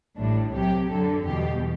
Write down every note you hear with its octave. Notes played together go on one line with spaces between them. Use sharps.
A1 A2 G3 D4
C2 C3 F#3 G4
F#2 D3 F#3 A4
E2 B2 G3 G4